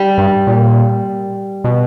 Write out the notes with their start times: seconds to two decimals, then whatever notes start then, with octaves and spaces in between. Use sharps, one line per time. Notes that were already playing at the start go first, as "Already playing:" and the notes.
Already playing: G3
0.18 G2
0.47 A#2
1.64 B2